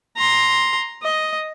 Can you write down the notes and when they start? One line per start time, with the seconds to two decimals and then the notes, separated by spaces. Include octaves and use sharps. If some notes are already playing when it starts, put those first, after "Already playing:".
0.17 A#5 C6
1.03 D#5